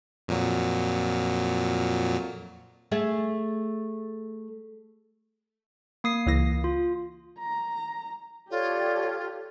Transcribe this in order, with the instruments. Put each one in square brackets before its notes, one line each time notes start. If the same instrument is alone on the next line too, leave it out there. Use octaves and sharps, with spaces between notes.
[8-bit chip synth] F2 A#2 F#3
[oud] A3 G#4 E5
[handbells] A#3 D#6 C7
[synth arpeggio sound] C#2 E3 A#6
[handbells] F4
[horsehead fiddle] A#5
[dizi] F4 [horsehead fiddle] G4 [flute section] A4 C#5 D5